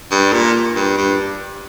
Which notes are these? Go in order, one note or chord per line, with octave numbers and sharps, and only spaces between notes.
G2
A#2
G2
G2